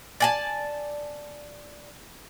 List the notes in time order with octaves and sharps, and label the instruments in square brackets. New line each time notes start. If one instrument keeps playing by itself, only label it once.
[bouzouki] D5 G#5 A5